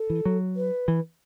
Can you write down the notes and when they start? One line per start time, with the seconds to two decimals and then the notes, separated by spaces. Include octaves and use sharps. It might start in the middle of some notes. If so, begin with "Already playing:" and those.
Already playing: A4
0.10 E3
0.25 F#3
0.56 B4
0.88 E3